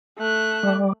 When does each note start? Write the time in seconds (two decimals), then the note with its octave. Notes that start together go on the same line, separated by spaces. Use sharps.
0.18 A3 F#6
0.63 G3